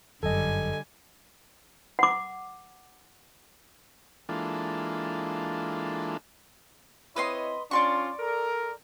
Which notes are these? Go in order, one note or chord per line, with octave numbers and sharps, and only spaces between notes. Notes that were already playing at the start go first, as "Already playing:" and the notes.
G1 F#2 D3 G3 A4 D#5 G#5
F#5 D6
E3 G#3 A#3 D4 F4 A4
C4 E4 B4 C#5 D#5 C6
C#4 D4 F4 D5 C6 C#6
A4 A#4